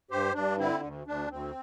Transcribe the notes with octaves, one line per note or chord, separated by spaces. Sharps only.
G2 G4 C5
G2 D4
D3 C4 E4
D2
D2 D4
D2 C4